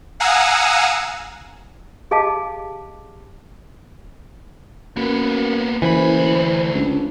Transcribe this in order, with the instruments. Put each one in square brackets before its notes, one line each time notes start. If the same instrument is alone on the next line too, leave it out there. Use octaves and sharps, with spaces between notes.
[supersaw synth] F5 F#5 G#5 A#5 D#6 E6
[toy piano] G4 G#4 D#5 F5 A5 D6
[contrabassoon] F#2 [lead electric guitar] A#3 B3
[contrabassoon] F#1 [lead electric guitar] D2 B5 [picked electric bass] E3 [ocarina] C5
[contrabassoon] C#2 [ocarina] D4